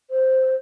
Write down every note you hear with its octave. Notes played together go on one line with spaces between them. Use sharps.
C5